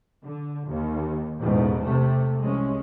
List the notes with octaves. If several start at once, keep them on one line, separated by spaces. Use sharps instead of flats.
D3
D#2
A1 E2 G#2 B2
C3 A3
C2 G#3 C#4